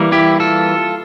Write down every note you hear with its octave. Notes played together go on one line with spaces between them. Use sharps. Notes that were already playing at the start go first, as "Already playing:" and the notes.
Already playing: E3 G3 A#3
E4 G4
F4 A4